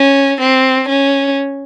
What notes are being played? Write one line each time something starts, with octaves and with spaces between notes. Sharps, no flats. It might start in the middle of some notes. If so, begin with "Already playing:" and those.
Already playing: C#4
C4
C#4